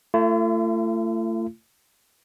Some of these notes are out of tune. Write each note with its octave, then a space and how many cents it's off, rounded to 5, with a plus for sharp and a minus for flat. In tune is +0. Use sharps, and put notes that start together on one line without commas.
A3 +25 F4 -45